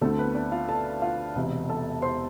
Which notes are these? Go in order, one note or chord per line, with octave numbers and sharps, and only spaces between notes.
D2 D3 A3 C4 A4
B3 B4
D4 D5
F4 F5
A4 A5
F4 F5
E1 E2 C3
A4 A5
C5 C6